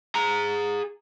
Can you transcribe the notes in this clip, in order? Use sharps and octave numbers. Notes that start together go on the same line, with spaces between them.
G#4 A#5